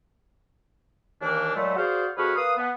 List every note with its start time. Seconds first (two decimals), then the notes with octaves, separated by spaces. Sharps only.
1.22 D#2 D#3 E3 A#3 D4
1.55 A#2 F#3 G#3 A3
1.77 F#4 G#4 C5 D5 F5
2.17 F2 F#4 G#4 B4 F6
2.36 A#3 B4 F5 D#6
2.58 B3